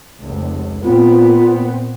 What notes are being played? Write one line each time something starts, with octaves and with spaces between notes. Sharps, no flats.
F1 C#2
A#2 B3 C4 F4